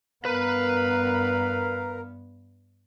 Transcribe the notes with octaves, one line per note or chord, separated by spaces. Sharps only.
G2 B3 A#4 B4 F5 B5